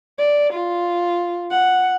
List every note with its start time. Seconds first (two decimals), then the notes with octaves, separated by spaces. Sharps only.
0.18 D5
0.53 F4
1.51 F#5